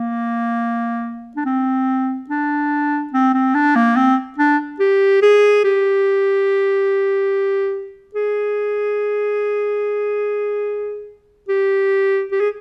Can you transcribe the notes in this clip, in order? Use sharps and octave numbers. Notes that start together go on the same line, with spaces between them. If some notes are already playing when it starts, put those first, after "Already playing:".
Already playing: A#3
D4
C4
D4
C4
C4
D4
A#3
C4
D4
G4
G#4
G4
G#4
G4
G4
G#4